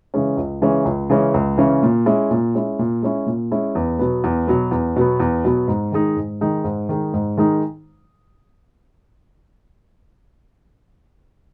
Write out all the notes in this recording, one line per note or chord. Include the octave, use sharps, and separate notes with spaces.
C#3 E3 G#3 C#4
C#2
C#3 E3 G#3 C#4
C#2
C#3 E3 G#3 C#4
C#2
C#3 E3 G#3 C#4
A#2
G#3 C#4 E4
A#2
G#3 C#4 E4
A#2
G#3 C#4 E4
A#2
G#3 C#4 E4
E2
B2 F#3 B3
E2
B2 F#3 B3
E2
B2 F#3 B3
E2
B2 F#3 B3
G#2
D#3 G#3 D#4
G#2
D#3 G#3 D#4
G#2
D#3 G#3 D#4
G#2
D#3 G#3 D#4